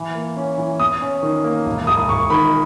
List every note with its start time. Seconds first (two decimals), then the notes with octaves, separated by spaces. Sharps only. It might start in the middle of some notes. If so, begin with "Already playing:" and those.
Already playing: E3
0.15 A#3
0.37 C#4
0.58 E3
0.79 E2 D#6
1.01 C#4
1.23 D#3
1.44 A#3
1.66 E1
1.87 E1 D#6
2.09 E1 C#6
2.30 D#3 B5